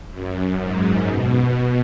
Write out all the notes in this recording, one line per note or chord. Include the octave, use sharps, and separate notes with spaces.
F#2
G#2
B2